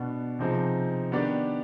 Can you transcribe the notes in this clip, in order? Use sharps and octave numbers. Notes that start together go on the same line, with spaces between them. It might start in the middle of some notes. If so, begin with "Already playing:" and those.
Already playing: B2 B3 D4
C3 F3 C4 D#4 G#4
D#3 B3 D4 G4 D5